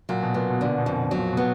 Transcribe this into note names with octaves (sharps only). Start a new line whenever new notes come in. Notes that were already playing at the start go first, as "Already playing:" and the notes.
A#2 F#3
B2
A#2 B3
B2
A#2 D3
B2
F2
A#2
B2
F#3
A#2
B2 B3